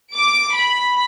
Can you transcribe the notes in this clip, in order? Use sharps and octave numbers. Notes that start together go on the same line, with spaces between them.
D6 D7
B5